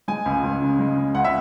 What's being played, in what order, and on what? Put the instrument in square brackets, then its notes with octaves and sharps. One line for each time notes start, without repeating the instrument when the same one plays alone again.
[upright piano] G#3 G#5
C#2
C#2
C#3
G#3
C#2
C#2 F#5
E5